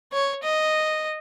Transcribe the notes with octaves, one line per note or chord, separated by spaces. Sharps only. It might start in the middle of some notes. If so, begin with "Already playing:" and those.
C#5
D#5